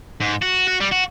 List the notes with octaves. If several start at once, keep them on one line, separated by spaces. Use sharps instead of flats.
G#2
F#4
F#4
G3
F#4